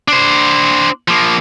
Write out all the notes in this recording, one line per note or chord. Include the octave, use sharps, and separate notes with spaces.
D4 C5
F3 A#3